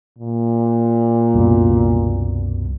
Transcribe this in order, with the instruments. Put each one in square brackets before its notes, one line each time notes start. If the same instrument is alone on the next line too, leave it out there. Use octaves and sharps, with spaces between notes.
[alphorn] A#2
[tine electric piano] C2 F#2 B2